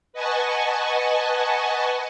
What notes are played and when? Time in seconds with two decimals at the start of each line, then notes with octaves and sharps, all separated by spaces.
0.13 B4 D#5 F#5 G#5 A5 C#6